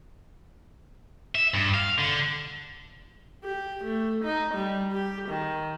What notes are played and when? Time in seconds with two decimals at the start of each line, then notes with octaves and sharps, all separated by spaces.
1.35 E5
1.54 G2
1.74 F5
1.98 D3
3.44 G4
3.84 A3
4.24 D#4
4.55 G3
4.92 G4
5.29 D#3